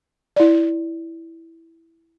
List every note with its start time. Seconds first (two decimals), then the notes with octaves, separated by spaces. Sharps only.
0.36 E4 D5